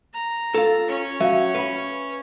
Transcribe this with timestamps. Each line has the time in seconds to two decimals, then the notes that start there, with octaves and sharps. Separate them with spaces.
0.14 A#5
0.54 F4 A4
0.89 C#4 C#5
1.20 F#3 E5 F5
1.55 B4 B5